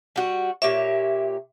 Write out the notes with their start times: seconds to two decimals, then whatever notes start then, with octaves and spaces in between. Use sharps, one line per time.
0.16 G3 F#4
0.62 A#2 G4 C#5 E5